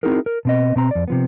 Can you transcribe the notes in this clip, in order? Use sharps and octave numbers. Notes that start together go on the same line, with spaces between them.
C4 D#4 E4 F#4 G#4 A#4
A#4
B2 C4 D#5
B2 C4 A#5
F2 D5
C3 F3 B3